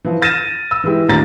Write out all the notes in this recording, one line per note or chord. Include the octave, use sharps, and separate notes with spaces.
E3 F3
F6 A6 A#6 D#7 E7
E6
E3 G#3 E4 G4
D#2 A2 F#3 D4 A#5 A6